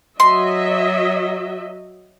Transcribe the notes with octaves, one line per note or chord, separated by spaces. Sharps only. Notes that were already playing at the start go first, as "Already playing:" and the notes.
F#3 D#5 E5 C6